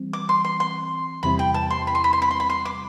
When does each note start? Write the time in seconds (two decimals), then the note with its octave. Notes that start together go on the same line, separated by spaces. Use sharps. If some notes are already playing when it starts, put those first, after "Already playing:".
Already playing: E3 G3 C4
0.13 D6
0.29 C6
0.45 C6
0.60 C6
1.23 E2 C3 G3 C4 E4 B5
1.39 G5
1.54 A5
1.70 C6
1.87 B5
1.95 C6
2.04 B5
2.13 C6
2.22 B5
2.31 C6
2.40 B5
2.50 C6
2.65 D6